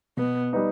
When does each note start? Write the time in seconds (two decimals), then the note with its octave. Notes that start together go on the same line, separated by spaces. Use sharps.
0.17 B2 B3
0.53 G3 B3 D#4